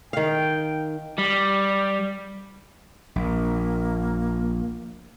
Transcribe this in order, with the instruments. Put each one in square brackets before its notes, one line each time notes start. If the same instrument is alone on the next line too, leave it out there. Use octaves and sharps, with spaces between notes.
[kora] D#3 F5 [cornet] G5
[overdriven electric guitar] G3
[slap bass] A#1 [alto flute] A#3